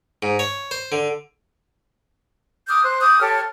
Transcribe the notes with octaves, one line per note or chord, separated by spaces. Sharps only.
G#2
C#5
C5
D3
D6 D#6 F6 G6
C5 F#6
D6 D#6 G6
G4 A4 C#5 F6